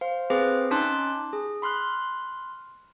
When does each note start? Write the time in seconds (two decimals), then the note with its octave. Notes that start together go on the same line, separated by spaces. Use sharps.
0.01 C5 F5
0.30 C4 G#4 B4 C5 F5 D6
0.71 C#4 D#4 A5 C6 D6 F#6
1.33 G#4
1.62 B5 C6 F6 F#6